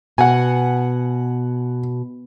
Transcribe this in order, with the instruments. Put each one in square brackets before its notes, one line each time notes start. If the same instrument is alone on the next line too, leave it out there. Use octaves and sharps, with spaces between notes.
[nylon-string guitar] B2 [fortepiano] F#5 G#5